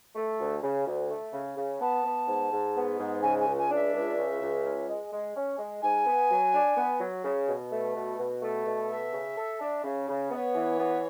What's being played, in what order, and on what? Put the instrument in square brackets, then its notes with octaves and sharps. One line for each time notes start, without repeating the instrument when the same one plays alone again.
[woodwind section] A3
D2
C#3
D2
A3
C#3
C#3
[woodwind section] B3 [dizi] A5
[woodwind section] B3
G#2
G#2
B3
G#2
[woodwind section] C#3 [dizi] G#5
[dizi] G#5
[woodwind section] C#2
[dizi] G#5
[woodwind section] D4
[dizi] E5
[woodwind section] C#2
C#3
C#2
C#4
G#3
G#3
C#4
G#3
[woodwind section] G#2 [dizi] G#5
[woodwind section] B3
F#3
D4
B3
F#3
C#3
B2
A3
B2
B2
A3
B2
[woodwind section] A4 [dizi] E5
[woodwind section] C#3
A4
D4
C#3
C#3
[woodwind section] B3 [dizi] E5
[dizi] C#5
[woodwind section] E3
B3